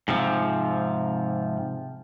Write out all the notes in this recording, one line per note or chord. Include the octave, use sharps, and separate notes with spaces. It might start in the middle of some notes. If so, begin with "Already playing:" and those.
G#2 C3 F3